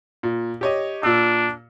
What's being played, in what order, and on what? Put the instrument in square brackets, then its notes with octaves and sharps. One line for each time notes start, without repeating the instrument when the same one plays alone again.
[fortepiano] A#2
G4 C#5 D#5
[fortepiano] A#2 E6 [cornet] D4